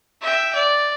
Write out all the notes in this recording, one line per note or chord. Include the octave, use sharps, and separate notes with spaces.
E5 G5
D5